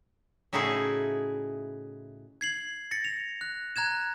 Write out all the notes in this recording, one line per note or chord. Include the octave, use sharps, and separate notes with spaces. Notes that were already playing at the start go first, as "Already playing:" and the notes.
A2 C#3 D#4 E4 F#4 G#4
G#6 C7 F#7
A6 A#6 C#7
F7
F#6
A#5 F#6 G#6 E7